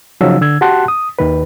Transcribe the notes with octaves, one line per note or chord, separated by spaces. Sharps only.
C#3 F3 F#3 D#4 F5 E6
D3 E6 G#6
F#4 G4 F#5 A5 C6 F#6
D#6
D#2 D#3 B4